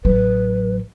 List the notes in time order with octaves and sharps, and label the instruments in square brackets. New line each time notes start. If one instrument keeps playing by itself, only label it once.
[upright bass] A1 F#3 [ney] B4